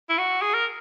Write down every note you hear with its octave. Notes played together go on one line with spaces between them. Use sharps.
E4
F#4
G#4
A#4